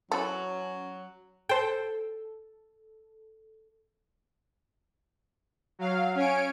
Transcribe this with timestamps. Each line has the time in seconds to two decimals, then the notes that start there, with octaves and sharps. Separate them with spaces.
0.11 E3 F#3 C#4 A4
1.49 A4 C5 G5
5.79 F#3 F5
6.15 C#4 C#5 G#5 D7